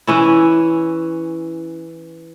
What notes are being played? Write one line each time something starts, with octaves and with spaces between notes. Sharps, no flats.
E3 C#4 E4